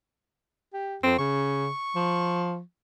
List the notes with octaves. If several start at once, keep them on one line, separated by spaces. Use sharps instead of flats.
G4
F2 C4
C#3 C#6
F3